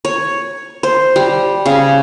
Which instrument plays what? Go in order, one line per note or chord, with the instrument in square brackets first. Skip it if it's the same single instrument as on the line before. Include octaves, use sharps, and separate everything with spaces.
[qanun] C#5
C5
G3
C#3